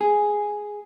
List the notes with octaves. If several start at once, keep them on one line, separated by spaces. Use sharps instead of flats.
G#4